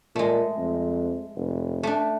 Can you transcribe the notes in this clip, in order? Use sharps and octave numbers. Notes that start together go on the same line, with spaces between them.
A#2 G#3 A3
F2
F1
A3 D4